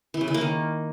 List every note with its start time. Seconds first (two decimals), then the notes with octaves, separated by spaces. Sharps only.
0.14 E3
0.21 C#3
0.28 E3
0.34 A#3
0.41 D#3